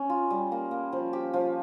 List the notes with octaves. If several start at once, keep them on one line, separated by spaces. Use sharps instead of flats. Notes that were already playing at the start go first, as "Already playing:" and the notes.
Already playing: C#4
F4
G3
A#3
A#3
F3
G4
F3